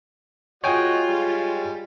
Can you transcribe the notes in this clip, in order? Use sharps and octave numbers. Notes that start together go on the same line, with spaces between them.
G#3 F4 F#4 C#5 D#5 G5 G#5
G3 G#3